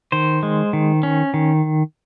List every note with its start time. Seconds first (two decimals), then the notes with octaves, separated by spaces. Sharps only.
0.12 D#3 C5
0.43 G#3
0.73 D#3
1.03 C#4
1.34 D#3